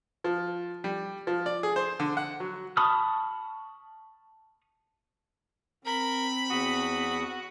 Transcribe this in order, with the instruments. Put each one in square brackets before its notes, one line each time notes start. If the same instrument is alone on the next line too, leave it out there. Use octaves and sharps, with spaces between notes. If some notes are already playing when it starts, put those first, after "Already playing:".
[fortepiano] F3
G3
F3
D5
G#4
C5
D3
F#5
F#3
[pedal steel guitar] A5 B5 C#6 D#6 F6
[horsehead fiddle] C4 [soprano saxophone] A#4 [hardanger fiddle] B5
[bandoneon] E2 D#6 [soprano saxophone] F#4